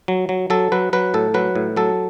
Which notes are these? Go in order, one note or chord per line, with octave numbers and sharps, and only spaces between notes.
F#3
F#3
F#3 A4
F#3 B4
F#3 B4
A2 A4
F#3 B4
A2
F#3 A4